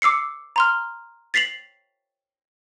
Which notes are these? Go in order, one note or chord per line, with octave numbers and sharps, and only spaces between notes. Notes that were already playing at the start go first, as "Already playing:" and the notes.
D6 E6 C7 C#7
A#5 C6 F6
A6 B6 C7 F7 F#7